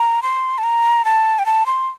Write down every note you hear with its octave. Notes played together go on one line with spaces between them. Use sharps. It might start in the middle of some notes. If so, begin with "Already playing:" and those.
Already playing: A#5
C6
A5
A#5
A5
G5
A5
C6